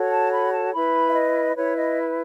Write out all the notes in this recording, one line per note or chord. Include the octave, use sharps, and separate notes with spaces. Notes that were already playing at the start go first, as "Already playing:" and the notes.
Already playing: F#4 A4 C#5
A5
B5
A5
E4 B4 B5
E5
D#5
E4 B4 C#5
D#5